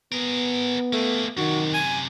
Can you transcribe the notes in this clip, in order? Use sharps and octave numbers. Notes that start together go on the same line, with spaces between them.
B3 G#4 A#4
A3 A#3 G#4
F#2 C3 D#3 F#4
G#5